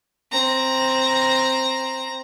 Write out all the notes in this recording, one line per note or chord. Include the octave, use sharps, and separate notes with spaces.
C4 A#5